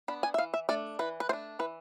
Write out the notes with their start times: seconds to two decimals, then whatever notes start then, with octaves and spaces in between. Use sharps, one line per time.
0.08 B3 D4 B5
0.23 G#5
0.34 E5
0.38 E3 F5
0.54 E5
0.69 A3 D4 D5
0.99 E3 B4
1.20 B4
1.29 A3 C5
1.33 D4
1.59 E3 B4